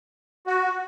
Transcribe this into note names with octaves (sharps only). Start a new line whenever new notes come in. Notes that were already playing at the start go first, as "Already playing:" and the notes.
F#4